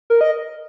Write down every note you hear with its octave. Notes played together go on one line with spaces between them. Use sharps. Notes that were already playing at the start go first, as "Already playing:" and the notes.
A#4
D#5